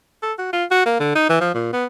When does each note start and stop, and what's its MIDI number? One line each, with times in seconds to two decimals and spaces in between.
0.22 0.33 69
0.38 0.51 66
0.53 0.64 65
0.71 0.81 66
0.85 0.99 58
1.00 1.15 50
1.15 1.25 63
1.29 1.39 52
1.40 1.51 53
1.54 1.71 46
1.73 1.85 59